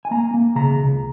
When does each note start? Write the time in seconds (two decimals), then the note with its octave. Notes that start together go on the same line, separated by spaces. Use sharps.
0.05 G#5
0.11 A#3 A#5
0.34 A#3
0.55 C#3 A#5
0.79 C#2